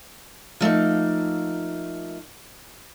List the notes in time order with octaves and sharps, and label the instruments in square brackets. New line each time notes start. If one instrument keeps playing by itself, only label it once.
[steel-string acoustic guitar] F3 A3 A#3 D#4